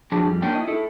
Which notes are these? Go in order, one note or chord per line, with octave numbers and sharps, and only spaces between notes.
F3 F#3 D4 G#4 A5
F2 G3
A#3 C#4 D4 G5
E4 D#5
E4 A4